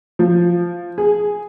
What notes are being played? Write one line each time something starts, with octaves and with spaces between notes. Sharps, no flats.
F3
G#4